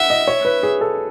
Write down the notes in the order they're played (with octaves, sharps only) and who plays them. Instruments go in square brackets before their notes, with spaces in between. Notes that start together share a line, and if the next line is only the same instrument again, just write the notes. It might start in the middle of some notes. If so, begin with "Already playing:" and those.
Already playing: [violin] E5 [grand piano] F#5
[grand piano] D#5
C#5
B4
G#4
A4